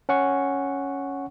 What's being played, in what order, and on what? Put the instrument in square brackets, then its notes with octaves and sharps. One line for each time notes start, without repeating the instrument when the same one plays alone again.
[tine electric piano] C#4 F#5 C#6